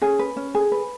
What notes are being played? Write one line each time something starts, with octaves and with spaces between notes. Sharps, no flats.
C#4 G#4 G#5
B4
C#4
G#4
B4